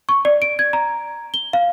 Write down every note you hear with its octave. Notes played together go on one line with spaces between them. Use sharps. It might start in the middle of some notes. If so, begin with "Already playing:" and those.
C#6
D5
D7
G#6
A#5
G7
F5